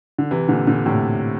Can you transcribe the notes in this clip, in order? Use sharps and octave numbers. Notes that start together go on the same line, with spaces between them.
D3
C3 E3
A#2 D3
A#2 D3
A2 C3